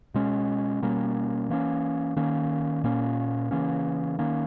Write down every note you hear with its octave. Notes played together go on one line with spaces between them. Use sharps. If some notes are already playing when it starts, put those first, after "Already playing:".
B2 G#3 C#4
B2 G3 A#3 C#4
E3 A#3 C#4
D#3 A#3 C#4
A#2 A#3 C#4
C#3 E3 A#3 C#4
D#3 A#3 C#4